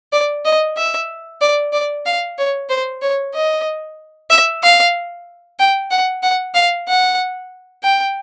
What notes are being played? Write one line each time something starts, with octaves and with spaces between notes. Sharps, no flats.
D5
D#5
E5
D5
D5
F5
C#5
C5
C#5
D#5
E5
F5
G5
F#5
F#5
F5
F#5
G5